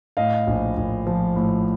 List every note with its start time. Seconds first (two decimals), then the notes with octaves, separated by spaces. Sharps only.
0.17 A2 D#5 F5
0.47 A#1
0.77 A#1
1.07 F3
1.36 A2